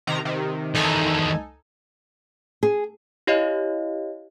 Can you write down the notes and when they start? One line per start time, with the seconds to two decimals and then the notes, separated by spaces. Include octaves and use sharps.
0.07 C3 D#3 A#5
0.25 C3 D#3
0.75 E2 D#3 D#4 A4 G#5
2.63 G#4
3.27 E4 G4 C#5 D#5 F5